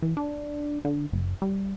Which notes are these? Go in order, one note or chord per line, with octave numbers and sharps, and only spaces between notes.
E3
D4
D3
F#1
G3